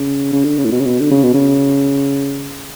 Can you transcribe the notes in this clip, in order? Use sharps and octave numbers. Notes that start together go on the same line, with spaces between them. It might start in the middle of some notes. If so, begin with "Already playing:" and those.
Already playing: C#3
C#3
D3
C#3
A2
B2
C#3
B2
D3
C#3
B2
C#3